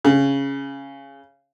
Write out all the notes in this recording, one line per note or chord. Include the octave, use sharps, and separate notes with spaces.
C#3